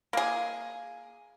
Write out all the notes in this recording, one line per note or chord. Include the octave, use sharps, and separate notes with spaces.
A#3 G#4